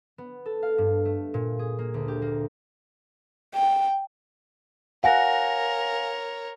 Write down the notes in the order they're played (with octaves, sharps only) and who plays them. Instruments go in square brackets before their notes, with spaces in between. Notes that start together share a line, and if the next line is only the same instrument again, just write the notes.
[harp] B3
A4
F5
G2
A3
A#2
G#4
A#3
D2
G4
A#3
[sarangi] G5
[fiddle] A#4 C#5 [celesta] F5 G#5 A#6 [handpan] F#5